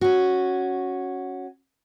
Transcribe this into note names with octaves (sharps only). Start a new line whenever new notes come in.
C#4 F#4